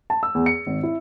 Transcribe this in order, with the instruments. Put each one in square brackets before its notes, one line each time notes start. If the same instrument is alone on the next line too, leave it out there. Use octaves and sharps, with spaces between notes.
[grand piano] A5
E6
E2
C#7
G#1
E4